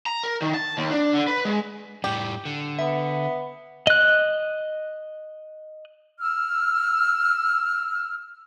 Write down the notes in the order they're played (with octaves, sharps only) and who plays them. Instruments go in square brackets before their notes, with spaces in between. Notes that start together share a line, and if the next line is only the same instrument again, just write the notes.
[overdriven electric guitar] A#5
A#4
D#3
A5
D#2
D4
D3
B4
G#3
[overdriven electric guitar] A2 G3 [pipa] G4
[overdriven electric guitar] D3
[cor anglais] B3 [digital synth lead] E5
[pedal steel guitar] D#5 F#6
[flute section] E6 F6